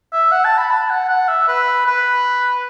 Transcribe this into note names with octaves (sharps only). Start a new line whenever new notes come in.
E5
F#5
A5
B5
A5
F#5
F#5
E5
B4
B4